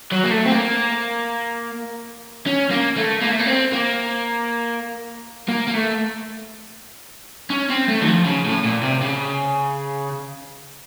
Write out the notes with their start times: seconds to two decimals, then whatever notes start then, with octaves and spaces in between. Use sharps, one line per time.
0.12 F#3
0.24 A#3
0.31 A3
0.46 C4
0.51 A#3
2.46 C#4
2.71 A#3
2.97 A3
3.22 A#3
3.32 A3
3.40 A#3
3.46 C4
3.73 A#3
5.48 A#3
5.68 A#3
5.74 A3
7.50 C#4
7.70 C4
7.88 A3
8.01 D#3
8.08 F3
8.26 C#3
8.45 A2
8.64 A#2
8.83 C3
9.02 C#3